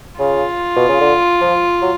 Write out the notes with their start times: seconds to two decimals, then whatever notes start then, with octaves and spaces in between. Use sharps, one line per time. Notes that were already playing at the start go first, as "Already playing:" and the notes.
0.19 C#3 F4
0.76 B2
0.89 C#3
1.01 D3
1.41 F3
1.82 F#3